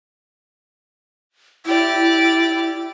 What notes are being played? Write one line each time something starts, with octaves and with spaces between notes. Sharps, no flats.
E4 G4 D5